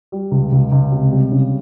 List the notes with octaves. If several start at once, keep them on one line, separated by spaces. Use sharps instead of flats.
G3
C#2
C#2
C#2
C3
G3
C#3